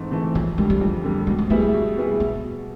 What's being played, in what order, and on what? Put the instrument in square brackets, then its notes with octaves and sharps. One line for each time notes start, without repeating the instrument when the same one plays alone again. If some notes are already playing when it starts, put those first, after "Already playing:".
Already playing: [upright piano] G#2 E3 A3 C4
E3 A3 C4
[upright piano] F2 [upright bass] F#3
[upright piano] D3 G3 [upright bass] G#3
[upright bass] G3
[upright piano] F2
D3 G3
[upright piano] B2 [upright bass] G#3
[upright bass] G#3
[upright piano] G3 B3 E4 G#4 [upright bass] A3
[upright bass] B3
[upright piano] B2
G3 B3 E4 G#4
[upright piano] B2 [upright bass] B3